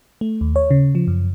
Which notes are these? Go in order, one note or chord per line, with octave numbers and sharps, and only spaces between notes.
A3
D#2
C#5
C#3
F3
F#2